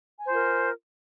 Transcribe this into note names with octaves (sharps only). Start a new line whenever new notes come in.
F4 A#4 C5 G#5